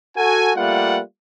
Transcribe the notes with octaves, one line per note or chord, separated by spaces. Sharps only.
F#4 A4 G#5
G3 A3 A#3 F4 F#5